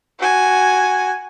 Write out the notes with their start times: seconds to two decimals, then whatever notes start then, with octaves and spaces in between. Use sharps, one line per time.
0.19 F#4 G#5